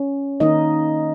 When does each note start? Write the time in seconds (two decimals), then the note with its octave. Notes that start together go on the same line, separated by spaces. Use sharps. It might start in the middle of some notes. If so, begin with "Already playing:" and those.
Already playing: C#4
0.40 D#3 A#3 D#4 D#5